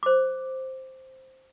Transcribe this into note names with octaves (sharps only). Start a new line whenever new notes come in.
C5 D6